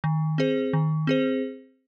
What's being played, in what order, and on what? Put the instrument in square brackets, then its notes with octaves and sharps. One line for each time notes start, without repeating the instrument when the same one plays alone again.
[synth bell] D#3
C4 G#4 C5
D#3
C4 G#4 C5